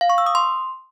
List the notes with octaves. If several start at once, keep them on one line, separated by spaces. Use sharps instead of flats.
F5
C#6
E6
D#6
C6